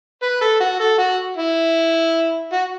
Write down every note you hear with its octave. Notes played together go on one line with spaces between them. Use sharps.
B4
A4
F#4
A4
F#4
E4
F#4